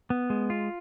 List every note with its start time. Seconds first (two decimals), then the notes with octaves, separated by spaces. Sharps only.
0.10 B3
0.30 G#3
0.50 F4